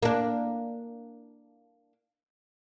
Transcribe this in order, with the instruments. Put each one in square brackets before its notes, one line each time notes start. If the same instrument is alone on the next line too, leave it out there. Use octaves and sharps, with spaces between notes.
[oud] A#3 D4